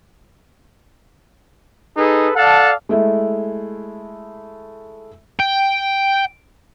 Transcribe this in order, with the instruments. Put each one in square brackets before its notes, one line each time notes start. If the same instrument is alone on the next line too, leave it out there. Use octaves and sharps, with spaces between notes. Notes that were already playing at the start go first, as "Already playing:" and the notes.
[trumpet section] D#4 G#4 A4 B4
A4 D5 F5 F#5 A5
[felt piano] G#3 A3 E4
[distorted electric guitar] G5